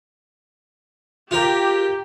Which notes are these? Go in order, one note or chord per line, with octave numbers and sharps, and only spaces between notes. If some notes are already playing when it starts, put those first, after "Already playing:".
F4 G4 A#4